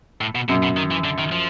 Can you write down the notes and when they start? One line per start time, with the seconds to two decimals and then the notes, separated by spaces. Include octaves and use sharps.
0.21 A2
0.35 B2
0.49 F#2 B2
0.63 B2
0.77 D#3
0.91 E3
1.04 D3
1.18 D#3
1.32 F3